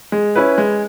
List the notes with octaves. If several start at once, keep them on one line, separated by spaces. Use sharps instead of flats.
G#3
C#4 E4 B4
G#3